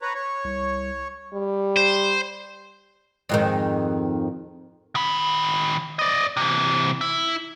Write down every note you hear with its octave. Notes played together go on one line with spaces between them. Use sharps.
B4 C#5 A#5
C#5
C2
G3
C5
F2 G#2 D#3
D#3 B5
D5 D#5
C3 E3
E4